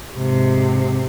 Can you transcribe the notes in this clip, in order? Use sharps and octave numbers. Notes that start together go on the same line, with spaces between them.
G#2 C3